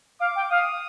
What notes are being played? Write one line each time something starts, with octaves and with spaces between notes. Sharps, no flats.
F5 D6
G5
F5 D#6